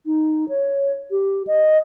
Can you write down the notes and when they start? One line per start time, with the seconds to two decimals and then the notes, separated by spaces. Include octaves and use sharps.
0.06 D#4
0.49 C#5
1.11 G4
1.47 D#5